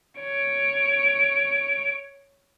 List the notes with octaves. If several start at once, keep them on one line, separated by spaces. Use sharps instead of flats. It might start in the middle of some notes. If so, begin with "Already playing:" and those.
C#5 D7